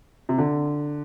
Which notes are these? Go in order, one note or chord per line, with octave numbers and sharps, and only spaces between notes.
C3
D3